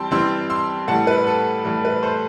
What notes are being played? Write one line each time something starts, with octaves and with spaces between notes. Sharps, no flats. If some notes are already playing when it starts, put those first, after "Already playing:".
Already playing: E3 G3 C4 G5 A5 C6 E6
E3 G3 C4 C6 E6
C6 E6
A2 E3 G3 F#5 A5
B4
A4
A2 E3 G3 A4
B4
A4 C5